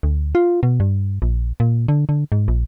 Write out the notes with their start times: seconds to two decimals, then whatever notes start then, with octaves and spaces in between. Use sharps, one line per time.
0.03 D2
0.35 F4
0.63 B2
0.80 G2
1.22 A#1
1.60 A#2
1.88 D3
2.09 D3
2.32 G#2
2.48 A#1